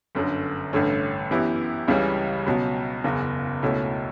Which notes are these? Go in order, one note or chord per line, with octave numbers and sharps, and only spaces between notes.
G1 F#2 D3
A1 G2 D3 A3 C#4
F#2 E3 B3 E4 G4
C#2 C#3 E3 G3 C#4
C#2 B2 F#3
F#1 E2 C#3
C#2 B2 A3 C#4 E4